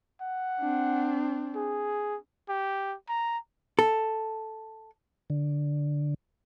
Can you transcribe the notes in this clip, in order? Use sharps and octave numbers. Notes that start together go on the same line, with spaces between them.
F#5
C4 D4
G#4
G4
A#5
A4
D3